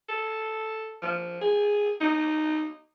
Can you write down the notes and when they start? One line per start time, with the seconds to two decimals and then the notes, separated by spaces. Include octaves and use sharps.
0.09 A4
1.02 F3
1.41 G#4
2.01 D#4